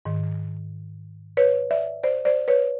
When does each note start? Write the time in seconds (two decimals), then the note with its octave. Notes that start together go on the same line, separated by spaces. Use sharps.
0.05 G#2 D#3
1.37 B4 C#5
1.71 D5 E5
2.04 C5 D5
2.25 C5 D5
2.48 B4 C#5